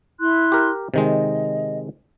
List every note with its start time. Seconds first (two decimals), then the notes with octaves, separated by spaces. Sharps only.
0.20 E4 C6 F#6
0.52 G4 A#4
0.94 C3 D#3 G#3 D#5